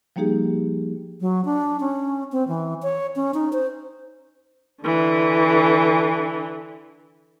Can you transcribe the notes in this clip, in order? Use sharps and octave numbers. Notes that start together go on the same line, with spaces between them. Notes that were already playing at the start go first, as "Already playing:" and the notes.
F3 G3 A#3 D#4 G4 G#4
F#3
D4
C#4
C4
E3
C#5
C#4
D#4
C5
D3 E3